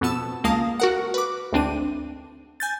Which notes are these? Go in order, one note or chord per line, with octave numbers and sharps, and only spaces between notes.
F2 B2 B3 A5 E6 E7
C#2 A#3 F5 A5 D#6 A#6
F#4 A#4 F#5
B4 D6
G#1 D2 C4 D4 D#7
G#5 G6 A6